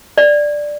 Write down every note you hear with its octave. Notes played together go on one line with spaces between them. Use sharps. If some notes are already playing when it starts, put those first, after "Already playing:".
D5